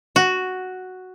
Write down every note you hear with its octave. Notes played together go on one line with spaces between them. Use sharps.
F#4